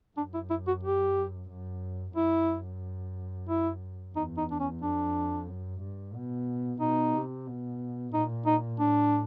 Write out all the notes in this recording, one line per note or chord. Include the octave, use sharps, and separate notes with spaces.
F#2 D4
E4
E4
F#4
G4
F#2
F#2 E4
E4
E2 D#4
D#4
D4
C#4
F2 D4
F#2
G2
B2
B2 D#4
C3
B2
A#2 D#4
D#4
A2 D4